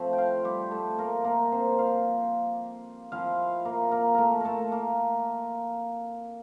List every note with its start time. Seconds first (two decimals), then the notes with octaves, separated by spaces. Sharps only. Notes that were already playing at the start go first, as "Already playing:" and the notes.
Already playing: F3 A3 C4
0.13 G5
0.18 F4 F5
0.45 G3 G4
0.71 A3 A4
0.98 A#3 A#4
1.24 A#3 A#4
1.52 C4 C5
1.78 F4 F5
3.12 F3 C4 E4 F4 F5
3.65 A#3 A#4
3.91 A#3 A#4
4.15 A3 A4 A#4
4.41 A3 A4 A#4
4.72 A#3 A#4